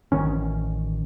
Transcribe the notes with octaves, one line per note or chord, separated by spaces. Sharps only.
A1 D#3 C#4